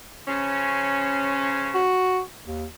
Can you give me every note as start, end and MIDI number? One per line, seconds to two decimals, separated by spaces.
0.27 1.84 49
0.27 1.84 53
0.27 1.84 61
1.75 2.21 66
2.46 2.65 39